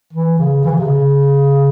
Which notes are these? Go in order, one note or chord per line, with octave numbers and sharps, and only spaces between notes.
E3
C#3
E3
C#3
C3
C#3